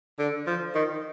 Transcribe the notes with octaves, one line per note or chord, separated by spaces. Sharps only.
D3
F3
D#3